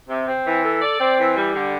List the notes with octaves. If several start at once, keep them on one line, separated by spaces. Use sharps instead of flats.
C3
C4
E3
A4
D5
C4
E3
G3
D3